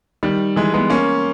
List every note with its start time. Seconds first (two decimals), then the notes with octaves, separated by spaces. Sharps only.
0.23 D#3 G3
0.56 E3 G#3
0.74 G#3 B3
0.90 A#3 C#4